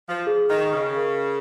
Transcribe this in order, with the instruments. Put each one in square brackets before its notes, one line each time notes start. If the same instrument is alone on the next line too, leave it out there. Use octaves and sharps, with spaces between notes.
[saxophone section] F3
[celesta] G#4
[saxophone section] D#3
[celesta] C#6
[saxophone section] C#3
[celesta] A#4